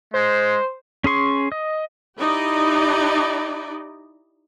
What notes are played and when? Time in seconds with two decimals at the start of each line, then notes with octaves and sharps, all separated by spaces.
0.14 G#3 C5
1.04 C#4 G#4 C6 C#6
1.52 D#5
2.21 D#4 E4 G4 D5 D#5